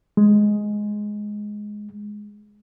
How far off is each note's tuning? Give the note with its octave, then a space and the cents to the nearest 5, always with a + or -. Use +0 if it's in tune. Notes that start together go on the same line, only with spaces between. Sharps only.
G#3 +5